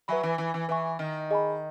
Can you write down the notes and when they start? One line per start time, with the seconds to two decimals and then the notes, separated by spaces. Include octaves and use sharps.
0.08 F#3 B4 E5 G#5 B5
0.23 E3
0.38 E3
0.54 E3
0.68 E3 B4 E5 G#5 C#6
0.99 D#3
1.30 G#4 D#5 G#5 B5